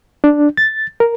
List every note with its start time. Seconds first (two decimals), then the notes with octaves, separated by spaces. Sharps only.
0.24 D4
0.57 A6
1.00 A#4